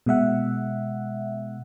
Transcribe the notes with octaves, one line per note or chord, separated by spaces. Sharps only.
B2 G#3 E5 F#5